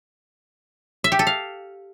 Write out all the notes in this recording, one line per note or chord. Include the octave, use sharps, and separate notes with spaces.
E5
G4
A4
F5